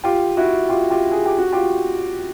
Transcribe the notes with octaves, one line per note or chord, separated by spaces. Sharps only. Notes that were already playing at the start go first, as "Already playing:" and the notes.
F4 G4
E4 F#4
F4 G4
F4 G4
G#4
G4
F#4
F4 G4